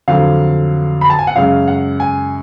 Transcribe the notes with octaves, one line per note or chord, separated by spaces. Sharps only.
F2 D3 F#3 F5
B5
A5
G#5
F#5
F#2 C#3 G#3 F5
F#5
G#5